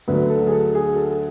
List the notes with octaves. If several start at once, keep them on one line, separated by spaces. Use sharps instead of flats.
D2 D3 F#3 B4
A4
G#4
A4
G#4
A4